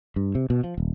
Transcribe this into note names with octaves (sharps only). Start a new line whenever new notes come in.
G2
C3
B2
F3
D#1